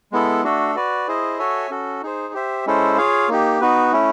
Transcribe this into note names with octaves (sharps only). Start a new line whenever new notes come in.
G#3 B3 E4 A4
A3 D4 F#4 A4
F#4 B4 D5
E4 G#4 C5 D#5
F#4 A4 C#5 E5 G#5
C#4 F#4 A4
D#4 G#4 C5
G4 C5 E5
G#3 C#4 E4 A4 C5
F4 G#4 C#5 F5
A#3 D#4 G4
B3 D#4 F#4 B4
A3 C#4 E4